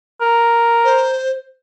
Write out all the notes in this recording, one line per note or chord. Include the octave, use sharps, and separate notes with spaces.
A#4
C5